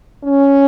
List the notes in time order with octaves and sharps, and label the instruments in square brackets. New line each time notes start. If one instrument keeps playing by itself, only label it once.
[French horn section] C#4